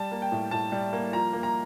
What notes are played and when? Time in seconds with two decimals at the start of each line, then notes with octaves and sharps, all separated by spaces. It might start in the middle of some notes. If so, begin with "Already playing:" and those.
Already playing: G3 A5
0.11 A#3
0.22 G5
0.32 A2
0.51 A2 A5
0.72 G3
0.93 A#3
1.13 F3 A#5
1.33 A#3
1.43 A#5